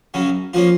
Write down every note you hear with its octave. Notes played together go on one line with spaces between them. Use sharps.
F#2 C#3 F#3 C#4
F3 A#3 C#4 F4